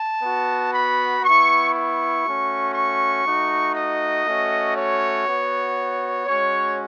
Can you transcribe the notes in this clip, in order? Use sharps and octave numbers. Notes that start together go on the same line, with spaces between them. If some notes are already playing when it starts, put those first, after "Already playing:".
Already playing: A5
B3 F#4
B5
B3 E4 C#6
C#6
A3 C#4 F#4
C#6
A3 D#4 F#4
D#5
A3 C#4 F#4
C#5
B3 F#4
G#3 C#4 F#4 C#5